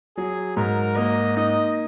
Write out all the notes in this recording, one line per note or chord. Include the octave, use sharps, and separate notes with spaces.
F#3 G#4
G#2 A#4
A#3 D#5
D#4 D#5